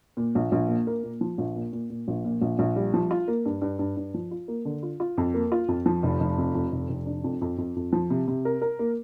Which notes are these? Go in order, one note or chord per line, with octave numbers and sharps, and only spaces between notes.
A#2
A#1
A#1
A#2
A#3
A#2
F3
A#1
A#2
A#2
A#2
A#1
A#2
A#1
A#1
G3
F3
F4
A#3
G2
G2
G2
G2
F3
F4
A#3
D3
F4
F4
F2
A#3
F4
F2
F3
F1
F1
F2
F2
F1
F1
D4
F2
F2
F2
F2
F3
C3
C3
A#4
A#4
A#3